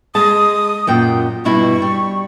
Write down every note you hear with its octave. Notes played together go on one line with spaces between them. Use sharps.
G#3 G#4 A5 D#6
F#2 A#2 G5
G2 B2 E4 C#6
G3